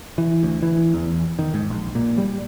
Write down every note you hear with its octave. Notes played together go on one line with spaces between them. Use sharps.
E3
D2
E3
E2
D#3
G#2
A#1
A#2
G3